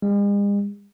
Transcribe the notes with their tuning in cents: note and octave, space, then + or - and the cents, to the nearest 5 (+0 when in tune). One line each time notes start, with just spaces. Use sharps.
G#3 -45